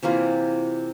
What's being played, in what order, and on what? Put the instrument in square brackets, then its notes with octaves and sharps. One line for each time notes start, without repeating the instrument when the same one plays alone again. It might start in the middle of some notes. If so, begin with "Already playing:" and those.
[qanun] C3 E3 A#3 F4